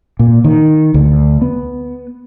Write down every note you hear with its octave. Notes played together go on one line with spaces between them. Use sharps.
A#2
D#3
D2
B3